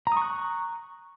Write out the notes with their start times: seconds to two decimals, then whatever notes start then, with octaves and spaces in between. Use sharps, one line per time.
0.07 A#5
0.12 D#6
0.17 C#6
0.22 F#6